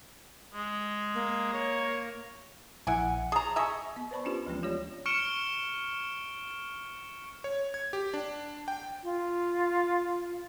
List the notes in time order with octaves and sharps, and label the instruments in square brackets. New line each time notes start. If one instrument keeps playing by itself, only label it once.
[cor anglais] G#3
[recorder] A#3
[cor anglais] C#5
[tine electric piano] A#1 F#5 [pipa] E4 G#5
[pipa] G#4 A#5 [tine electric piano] A5
[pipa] G#4 D#5 E5 [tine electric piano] A#5 C#6
[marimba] B3
B4 C5 D5 A5 B5 C#6
C#4 D4 F4 G4 B4
D2 E3 F3 G#3 A#3 C#4
G3 F4 G4 C#5 D5
[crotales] C#6 F6 C#7 D7 E7 G7
[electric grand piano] C#5
G#6
G4
D4
G5
[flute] F4